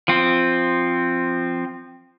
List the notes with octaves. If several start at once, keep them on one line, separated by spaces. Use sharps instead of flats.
F3 C4